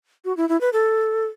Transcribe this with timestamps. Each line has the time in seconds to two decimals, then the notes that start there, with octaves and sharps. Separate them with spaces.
0.25 F#4
0.37 E4
0.49 E4
0.61 B4
0.73 A4